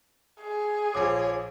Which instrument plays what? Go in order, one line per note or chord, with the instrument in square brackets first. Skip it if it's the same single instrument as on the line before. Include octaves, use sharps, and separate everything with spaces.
[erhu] G#4
[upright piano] A#1 F3 D6 [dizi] C#5